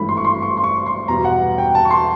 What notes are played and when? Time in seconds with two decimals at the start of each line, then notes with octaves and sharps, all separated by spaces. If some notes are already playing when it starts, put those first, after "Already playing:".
Already playing: G#1 G2 E3 A3 B5
0.09 C6
0.17 C#6
0.25 C6
0.42 C#6
0.57 C6
0.64 C#6
0.86 C6
1.08 E2 B2 G3 A#5
1.25 F#5
1.58 G5
1.75 A5
1.85 C#6
1.91 C6